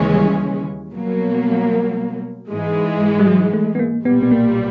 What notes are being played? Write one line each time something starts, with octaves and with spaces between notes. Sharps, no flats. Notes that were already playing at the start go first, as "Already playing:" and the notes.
Already playing: D#2 C#3 E3 G#3 C#4
G3
B2 F#3 A#3
G#2 E3 G#3
G3
F#3
A3
B3
A#3
B1 A#2 G3 B3
B3
A#3